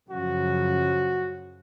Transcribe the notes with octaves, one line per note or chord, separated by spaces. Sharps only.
F#2 C#3 F3 F#4